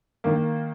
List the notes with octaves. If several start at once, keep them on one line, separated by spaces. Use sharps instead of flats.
D#3 A#3